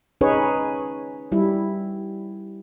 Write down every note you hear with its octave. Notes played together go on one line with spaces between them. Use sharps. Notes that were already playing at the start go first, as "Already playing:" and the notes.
C#4 D#4 G#4 B4 C#5
G3 E4